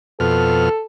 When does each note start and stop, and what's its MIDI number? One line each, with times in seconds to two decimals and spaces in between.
0.20 0.69 41
0.20 0.69 47
0.20 0.83 69
0.20 0.69 89